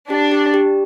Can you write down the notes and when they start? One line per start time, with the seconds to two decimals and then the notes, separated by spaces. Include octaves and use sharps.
0.10 D4 G4
0.32 G4
0.54 G4